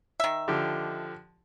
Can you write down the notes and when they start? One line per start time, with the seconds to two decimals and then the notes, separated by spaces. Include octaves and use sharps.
0.20 D#3 E5
0.48 D3 F3 G4